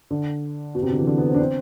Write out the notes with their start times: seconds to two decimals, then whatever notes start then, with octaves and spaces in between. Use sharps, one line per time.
0.10 D3
0.75 B2
0.82 C3
0.91 D3
0.99 E3
1.07 D3
1.18 B3
1.28 C4
1.35 D4
1.39 C4